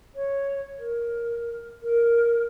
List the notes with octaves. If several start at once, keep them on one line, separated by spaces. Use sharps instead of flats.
C#5
A#4
A#4